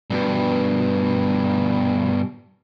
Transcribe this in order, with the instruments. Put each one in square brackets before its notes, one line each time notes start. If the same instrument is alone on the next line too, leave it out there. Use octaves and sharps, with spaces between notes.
[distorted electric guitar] G2 B2